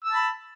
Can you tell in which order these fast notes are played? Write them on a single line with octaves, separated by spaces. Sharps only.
E6 A5 B5